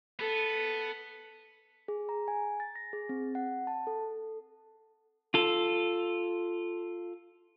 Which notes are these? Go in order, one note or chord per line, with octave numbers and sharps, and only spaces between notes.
B3 A4
G#4
A#5
G#5
A6
A#6
G#4
C4
F#5
A5
A4
F4 A4